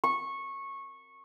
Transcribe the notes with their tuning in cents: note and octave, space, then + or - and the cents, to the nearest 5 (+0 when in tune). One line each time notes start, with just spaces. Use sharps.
C#6 -15